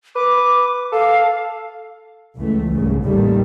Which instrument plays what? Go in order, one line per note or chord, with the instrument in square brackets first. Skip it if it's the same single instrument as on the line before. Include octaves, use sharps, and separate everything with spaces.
[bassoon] B4 [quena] D6
[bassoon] A4 [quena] F5
[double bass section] C#2 E3 A3
C2 G#2 C#3
A1 D#2 D#3 G3 A3